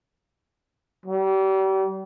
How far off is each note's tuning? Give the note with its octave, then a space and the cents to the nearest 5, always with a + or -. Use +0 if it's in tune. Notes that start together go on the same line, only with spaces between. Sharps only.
G3 -35